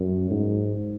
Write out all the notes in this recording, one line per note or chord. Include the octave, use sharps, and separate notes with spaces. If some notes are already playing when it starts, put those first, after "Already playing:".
Already playing: F#2
G#2